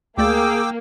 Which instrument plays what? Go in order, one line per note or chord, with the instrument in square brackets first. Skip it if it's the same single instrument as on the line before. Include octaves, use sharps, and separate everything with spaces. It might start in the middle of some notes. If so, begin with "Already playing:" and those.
[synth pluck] D2 A3 D5 [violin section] A#3 [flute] G#4 [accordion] G5 D6 E6